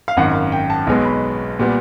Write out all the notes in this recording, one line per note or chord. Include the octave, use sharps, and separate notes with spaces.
F5
G#1 F#2 D#3 F#5
F5
G5
A5
B1 B2 G#3 B3
B5
A#2 G3 B3